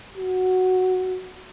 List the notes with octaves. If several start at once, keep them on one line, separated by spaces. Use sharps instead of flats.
F#4